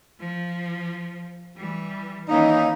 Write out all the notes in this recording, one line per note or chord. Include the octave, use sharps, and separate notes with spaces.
F3
E3 G3
D#3 E3 A#3 C#4 D#4